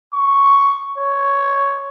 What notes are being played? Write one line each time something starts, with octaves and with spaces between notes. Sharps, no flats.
C#6
C#5